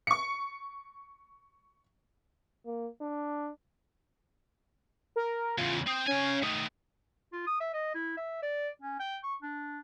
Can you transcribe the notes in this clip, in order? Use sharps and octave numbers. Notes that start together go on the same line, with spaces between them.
C#6 C#7
A#3
D4
A#4
E2 C#3 F4
C4 D#6
C#4 F5 G#5
D#3 A3 D#6
F4
D#6
E5
D#5
E4
E5
D5
C#4
G5
C#6
D4